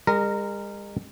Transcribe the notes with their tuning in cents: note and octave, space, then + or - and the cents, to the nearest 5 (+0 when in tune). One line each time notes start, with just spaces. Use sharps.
G#3 -45 A#4 -15 A#5 +0